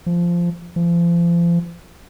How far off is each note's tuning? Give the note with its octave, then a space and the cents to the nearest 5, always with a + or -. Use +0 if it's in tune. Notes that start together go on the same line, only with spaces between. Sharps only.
F3 -10
F3 -35